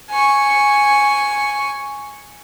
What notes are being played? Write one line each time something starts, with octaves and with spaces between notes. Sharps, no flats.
G#5 C#6